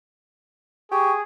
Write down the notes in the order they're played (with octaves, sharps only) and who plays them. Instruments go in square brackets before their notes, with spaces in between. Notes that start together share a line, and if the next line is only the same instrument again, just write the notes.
[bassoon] G4 [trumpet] G#4 [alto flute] C#6